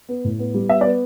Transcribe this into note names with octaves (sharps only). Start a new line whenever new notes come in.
B3
A2
B3
G3
B3 E5
D5
B3